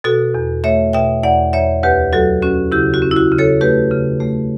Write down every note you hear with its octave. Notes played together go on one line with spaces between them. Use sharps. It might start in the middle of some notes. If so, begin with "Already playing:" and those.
B2 F#4 A4
E2
A3 C#5 E5
B2 E5 G5
E2 D5 F#5
E2 C#5 E5
D2 G4 B4
F#3 F#4 A4
C#4 F#4
C#3 E4 G4
F#4
C#4
E4
F#4
C#3
A4 C#5
A3 G4 B4
C#3
A3